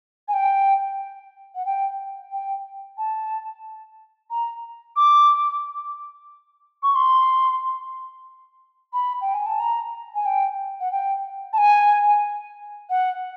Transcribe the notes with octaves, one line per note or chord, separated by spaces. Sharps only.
G#5
G5
F#5
G5
G5
A5
A#5
D6
C#6
C6
B5
G5
G#5
A5
A#5
G#5
G5
F#5
G5
A5
G#5
F#5